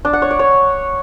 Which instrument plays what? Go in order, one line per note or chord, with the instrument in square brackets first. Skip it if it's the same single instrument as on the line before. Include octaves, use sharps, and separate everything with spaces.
[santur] D4
F#5
C#5
D5
C#5